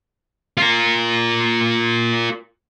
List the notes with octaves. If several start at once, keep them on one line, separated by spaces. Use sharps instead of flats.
F4 A#4